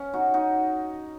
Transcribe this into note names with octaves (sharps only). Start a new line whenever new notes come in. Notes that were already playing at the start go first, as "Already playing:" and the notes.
Already playing: C#4
D#4 F#4
D#4 F#4